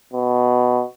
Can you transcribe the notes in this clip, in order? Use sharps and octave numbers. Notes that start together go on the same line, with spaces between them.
B2